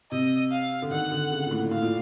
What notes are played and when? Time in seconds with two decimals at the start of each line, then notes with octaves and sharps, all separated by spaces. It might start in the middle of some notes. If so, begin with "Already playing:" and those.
0.11 C3 D#5
0.51 F5
0.82 D3
0.91 D#3 F#5
1.12 D3
1.31 C#3
1.46 A#2
1.51 A2
1.71 A2 F5
1.82 A#2